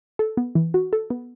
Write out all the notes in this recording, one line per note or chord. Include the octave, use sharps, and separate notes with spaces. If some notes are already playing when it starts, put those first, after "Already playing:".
A4
B3
E3
F#4
A4
B3